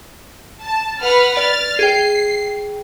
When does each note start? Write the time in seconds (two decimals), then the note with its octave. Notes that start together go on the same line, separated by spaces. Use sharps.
0.61 A5
1.01 B4 F#5 F6
1.37 D5 F6 A6
1.79 G#4 G5 C7